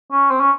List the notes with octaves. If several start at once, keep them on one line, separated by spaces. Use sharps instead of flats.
C#4
C4
C#4